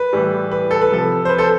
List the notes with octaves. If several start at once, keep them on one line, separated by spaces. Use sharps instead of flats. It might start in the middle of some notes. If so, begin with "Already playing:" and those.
Already playing: B4
A2 E3 G3
B4
A4
B4
C3 F3 A4
C5
B4
A4 C5